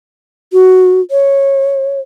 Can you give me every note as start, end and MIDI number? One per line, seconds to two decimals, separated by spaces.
0.53 1.01 66
1.11 2.00 73